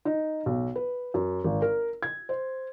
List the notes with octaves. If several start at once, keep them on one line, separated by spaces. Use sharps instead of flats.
D#4
B1
B4
F#2
G#1
A#4
G#6
C5